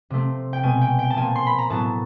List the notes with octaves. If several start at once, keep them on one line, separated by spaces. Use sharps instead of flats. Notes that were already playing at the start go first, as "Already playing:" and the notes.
C3 F3 A3 C4
G5
B2 G#3 C4 G#5
G5
G5
A5
A#2 F3 A#3 G#5
C6
B5
A#5
A2 F#3 B3 A5